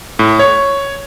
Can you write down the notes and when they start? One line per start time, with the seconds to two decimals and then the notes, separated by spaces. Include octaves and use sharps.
0.19 A2
0.39 C#5